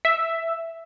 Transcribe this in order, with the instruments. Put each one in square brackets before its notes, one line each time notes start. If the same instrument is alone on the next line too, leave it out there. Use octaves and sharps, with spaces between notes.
[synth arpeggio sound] E5